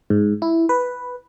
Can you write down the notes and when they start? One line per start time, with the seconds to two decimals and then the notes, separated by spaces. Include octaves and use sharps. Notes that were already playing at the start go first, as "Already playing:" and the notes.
0.10 G#2
0.42 E4
0.69 B4